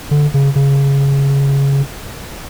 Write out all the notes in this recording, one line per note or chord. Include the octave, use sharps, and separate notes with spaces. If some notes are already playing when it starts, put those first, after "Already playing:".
D3
C#3
C#3